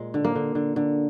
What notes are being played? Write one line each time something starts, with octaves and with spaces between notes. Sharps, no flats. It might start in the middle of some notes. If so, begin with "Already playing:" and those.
Already playing: A#2 G#3
D3
A#3
D3
D3
D3